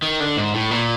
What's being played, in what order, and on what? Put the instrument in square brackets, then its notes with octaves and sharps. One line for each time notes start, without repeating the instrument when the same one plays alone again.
[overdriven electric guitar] D#3
D3
G#2
A2
A#2